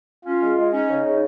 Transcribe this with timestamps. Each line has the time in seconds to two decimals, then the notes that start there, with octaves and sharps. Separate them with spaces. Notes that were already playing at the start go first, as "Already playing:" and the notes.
0.25 C#4 F4
0.41 G#3
0.58 G#3
0.73 C#4 D#4
0.89 C#3
1.05 C#3